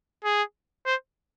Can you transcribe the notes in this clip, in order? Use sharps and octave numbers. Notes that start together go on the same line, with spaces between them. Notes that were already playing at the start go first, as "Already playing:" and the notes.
G#4
C5